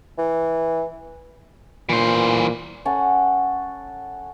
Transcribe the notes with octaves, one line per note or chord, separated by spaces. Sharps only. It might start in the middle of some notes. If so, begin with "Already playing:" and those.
E3
A#2 E3 C5
C#4 A4 F#5